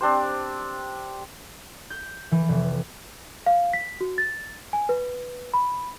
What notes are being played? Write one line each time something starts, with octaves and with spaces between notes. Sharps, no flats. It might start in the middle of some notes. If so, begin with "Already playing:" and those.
C4 D4 G4 C5
G6
E3
F1
F5
B6
F#4
A6
G#5
B4
B5